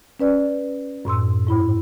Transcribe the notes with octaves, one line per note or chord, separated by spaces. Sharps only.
C#4 B4 D5
F#2 A2 C6 E6
G#2 E4 B5